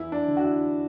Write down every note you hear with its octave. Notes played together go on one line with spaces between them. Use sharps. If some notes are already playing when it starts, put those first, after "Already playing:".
Already playing: E2 E4
D4
D3
F#4
E4